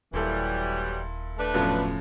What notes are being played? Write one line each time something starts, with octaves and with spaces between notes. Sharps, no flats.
D#1 A#2 E3 F#3 G3 E4 A4
A3 D4 B4
F#2 A2 F3 F#3 B3 F4